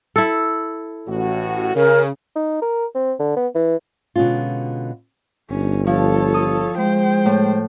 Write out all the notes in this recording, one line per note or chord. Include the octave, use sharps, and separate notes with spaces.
E4 A4
A1 A2 F#4
C#3 A#4
D#4
A#4
C4
D3
B3
E3
B2 D3 G#3 C#4 F4
G1 C#4 D#4
F3 A4 C#5
D#6
G#3 C5 G5
A2